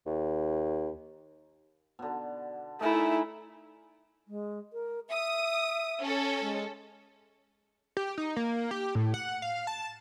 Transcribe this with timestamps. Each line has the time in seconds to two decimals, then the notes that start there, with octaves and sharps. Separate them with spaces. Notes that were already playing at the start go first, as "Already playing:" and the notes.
0.06 D#2
1.99 B2 D3
2.81 A3 D#4 E4 G#4 A#4
4.28 G#3
4.73 A#4
5.09 E5 D#6
6.02 C#4 A4
6.41 G#3
7.97 G4
8.18 D#4
8.36 A#3
8.71 G4
8.95 A2
9.14 F#5
9.42 F5
9.67 A5